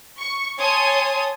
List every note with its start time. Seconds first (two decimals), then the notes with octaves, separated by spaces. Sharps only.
0.18 C#6
0.59 C#5 G#5 A5 C6 D#6